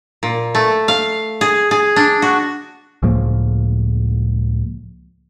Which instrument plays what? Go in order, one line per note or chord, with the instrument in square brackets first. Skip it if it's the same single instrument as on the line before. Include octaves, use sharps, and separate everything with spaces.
[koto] A#2
A3
F5
G#4
G#4
D4
F#4
[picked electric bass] C#2 A2 F3 A#3